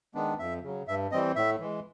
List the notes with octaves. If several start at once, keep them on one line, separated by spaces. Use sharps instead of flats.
D#3 G#3 B3 D4
F2 E5
C#3 F#3
G2 E5
E3 G3 C4 D#5
A2 E5
E3 G#3